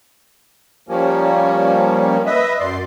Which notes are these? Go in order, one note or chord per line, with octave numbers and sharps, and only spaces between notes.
F3 G3 A#3 C#4
B4 D#5 E5
F#2 D5 C6